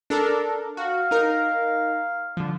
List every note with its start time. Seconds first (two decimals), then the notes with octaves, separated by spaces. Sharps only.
0.10 D4 A4 A#4
0.77 F#4 F5
1.11 D#4 A#4
2.37 D3 F3